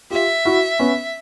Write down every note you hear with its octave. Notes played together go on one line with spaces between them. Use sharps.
F4 G4 E5
E4 F#4
B3 C#4